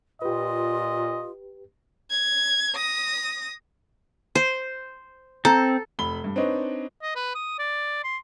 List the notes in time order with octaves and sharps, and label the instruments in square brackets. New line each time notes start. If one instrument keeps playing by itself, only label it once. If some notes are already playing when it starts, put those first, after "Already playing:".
[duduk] A#2 [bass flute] F4 [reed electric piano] G4 B4 [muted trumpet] D#5
[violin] G#6
D#6 A#6
[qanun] C5
[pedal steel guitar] C4 [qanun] A4 [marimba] A#5
[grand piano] F1 B5 G7
G2
C4 D4 D#4 B4 C#5 D#5
[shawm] D#5
B4
D#6
D5
C6